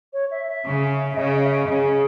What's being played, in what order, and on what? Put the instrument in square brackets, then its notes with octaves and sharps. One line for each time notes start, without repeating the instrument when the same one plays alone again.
[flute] C#5
E5
E5
[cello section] C#3
[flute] E5
[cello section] C#3 [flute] D#5
[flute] D#5
E5
D#5
[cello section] C#3 [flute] G#4